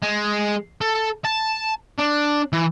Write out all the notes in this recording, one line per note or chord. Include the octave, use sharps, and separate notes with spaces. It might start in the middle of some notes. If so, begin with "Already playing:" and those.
G#3
A4
A5
D4
E3